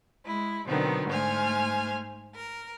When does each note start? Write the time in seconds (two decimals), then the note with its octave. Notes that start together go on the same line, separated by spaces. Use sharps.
0.25 G#3 E4
0.66 B2 D3 D#3 F#3 B3 C4
1.08 G#2 A3 C5 G#5 F6
2.34 A#4